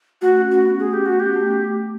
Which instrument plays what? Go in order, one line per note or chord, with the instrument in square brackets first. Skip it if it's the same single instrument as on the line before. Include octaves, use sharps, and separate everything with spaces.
[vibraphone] A3 [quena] F#4
[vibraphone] C#4
[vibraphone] C#4 [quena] F#4
[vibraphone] B3
[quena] G#4
G4
F#4
G4
[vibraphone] A3